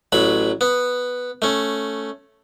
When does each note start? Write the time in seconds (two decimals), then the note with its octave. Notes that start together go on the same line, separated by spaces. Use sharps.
0.12 A1 F#3 B5
0.61 B3
1.42 A3 C#4